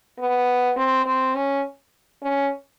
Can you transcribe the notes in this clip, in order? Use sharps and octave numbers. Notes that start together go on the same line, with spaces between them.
B3
C4
C4
C#4
C#4